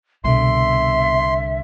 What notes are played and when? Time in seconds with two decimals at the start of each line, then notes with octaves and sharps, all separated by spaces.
0.24 C2 B2 D3 E5 C6